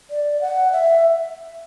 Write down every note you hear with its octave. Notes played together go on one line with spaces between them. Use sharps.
D5
F#5
E5